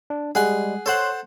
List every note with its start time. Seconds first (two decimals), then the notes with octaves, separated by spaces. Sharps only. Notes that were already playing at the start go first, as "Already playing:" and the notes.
0.10 D4
0.35 G3 G#3 G#4 F#5 G#5
0.86 A4 C5 C#5 F#5 C6 F#6